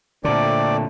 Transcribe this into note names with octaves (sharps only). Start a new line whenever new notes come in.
A#2 D3 A3 C4 D5